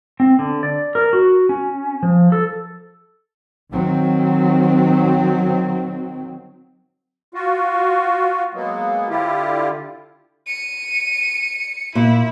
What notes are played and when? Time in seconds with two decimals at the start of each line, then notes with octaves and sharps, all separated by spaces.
0.20 C4
0.39 D3
0.63 D5
0.95 A#4
1.13 F#4
1.49 C#4
2.03 F3
2.32 A4
3.71 D#3 F#3 C4
7.34 F4 F#4
8.54 F#3 G#3 A#3 B3
9.09 D3 E4 F4 G4
10.46 C#7 D#7
11.95 A#2 E4